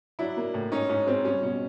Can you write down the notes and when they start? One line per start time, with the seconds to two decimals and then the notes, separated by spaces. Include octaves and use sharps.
0.19 F#3 D4 E4
0.37 A#3
0.54 A2
0.72 G#2 C#4 D#4
0.89 G#2 C#4
1.07 G#3 C4
1.25 G3 C#4
1.42 B2 C#4